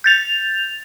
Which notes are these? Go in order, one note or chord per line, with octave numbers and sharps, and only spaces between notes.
G6 A6 F7